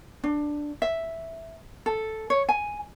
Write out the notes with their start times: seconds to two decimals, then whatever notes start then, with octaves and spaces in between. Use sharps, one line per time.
0.24 D4
0.82 E5
1.86 A4
2.30 C#5
2.49 G#5